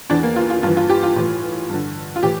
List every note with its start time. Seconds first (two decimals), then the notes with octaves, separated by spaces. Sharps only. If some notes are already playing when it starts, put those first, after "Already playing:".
0.10 E2 E3 D4
0.23 A#3
0.36 F4
0.50 F4
0.63 G2 F4
0.67 E3
0.77 F4
0.89 G4
1.03 F4
1.16 A2 E3
1.69 G2 D3
2.16 F4
2.22 A2 E3 G4